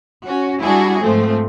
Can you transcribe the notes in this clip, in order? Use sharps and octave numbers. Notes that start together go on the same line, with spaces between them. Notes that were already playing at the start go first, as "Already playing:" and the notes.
C#4 F#4
G3 D4 E4 F#4 G#4
G#2 F3 A3 C4